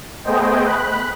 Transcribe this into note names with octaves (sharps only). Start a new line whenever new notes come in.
A3 B3 G#4 C5 D#5 G5
B5 F#6